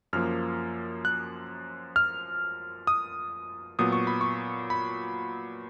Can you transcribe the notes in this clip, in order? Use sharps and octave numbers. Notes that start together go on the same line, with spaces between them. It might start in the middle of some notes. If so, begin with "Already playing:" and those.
F#2 F3 A#3 F6
F#6
F6
D#6
A#2 F#3 B3 D#6
C#6
B5
C#6
B5